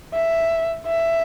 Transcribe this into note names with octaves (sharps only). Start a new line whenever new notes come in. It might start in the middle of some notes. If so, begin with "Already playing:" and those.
E5
E5